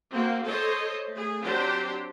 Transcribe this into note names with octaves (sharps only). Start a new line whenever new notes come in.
A#3 C4 F#4
A4 C5 C#5 D#5
A3 G#4
F#3 C4 D4 G4 C5